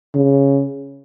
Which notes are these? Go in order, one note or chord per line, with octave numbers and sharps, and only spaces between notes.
C#3